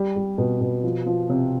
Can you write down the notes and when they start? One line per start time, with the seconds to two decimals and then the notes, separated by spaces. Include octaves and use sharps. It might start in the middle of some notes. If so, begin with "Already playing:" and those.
Already playing: G3
0.16 G3
0.38 B2
0.61 B2
0.84 F3
1.06 F3
1.30 C3